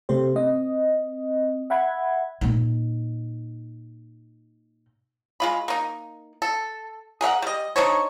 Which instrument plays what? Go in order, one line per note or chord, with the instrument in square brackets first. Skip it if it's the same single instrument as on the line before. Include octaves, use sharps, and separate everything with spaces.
[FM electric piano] C3 A3 G4 C5
C4 D#5
E5 F#5 B5 G#6
[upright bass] A#2 D#4
[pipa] G#3 F4 B5
A#3 D#4
A4
G#4 A#4 E5 F#5
G3 D#5
D4 D#4 C5 C#5